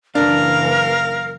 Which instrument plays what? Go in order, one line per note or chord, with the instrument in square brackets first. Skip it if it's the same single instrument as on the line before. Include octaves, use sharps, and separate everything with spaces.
[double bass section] F#1 E3 [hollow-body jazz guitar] D4 [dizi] A#4 [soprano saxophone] F5